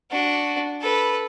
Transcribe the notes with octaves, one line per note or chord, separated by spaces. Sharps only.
D4 F#4
A4 B4